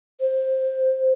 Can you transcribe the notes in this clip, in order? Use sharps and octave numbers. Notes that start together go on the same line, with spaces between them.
C5